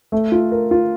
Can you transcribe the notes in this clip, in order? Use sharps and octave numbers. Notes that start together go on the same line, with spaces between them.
A3
F4
A#4
F4